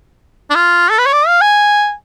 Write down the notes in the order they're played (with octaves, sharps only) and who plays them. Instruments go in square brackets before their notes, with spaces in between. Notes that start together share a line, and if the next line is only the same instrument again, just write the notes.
[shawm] D4
F4
A4
B4
C#5
D5
F5
G#5